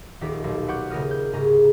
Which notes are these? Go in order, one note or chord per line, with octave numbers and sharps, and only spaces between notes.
D#1 D#2 G4 B6
B1 A#2
B4 C#5 F#5 C#6 D6 G6
D#1 C#3 A#4 D#6 F6
G6
C2 G#2 C#3 C#4 G#4 A#5